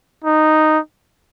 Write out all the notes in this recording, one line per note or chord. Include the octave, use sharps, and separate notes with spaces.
D#4